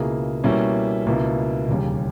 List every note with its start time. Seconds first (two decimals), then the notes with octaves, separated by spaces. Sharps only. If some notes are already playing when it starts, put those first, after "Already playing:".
Already playing: C#2 B2 A#3 E4 G#4
0.44 B2 G3 A#3 C#4 E4
1.07 C#2 B2 A#3 E4
1.68 E1 D#2 C#3 G3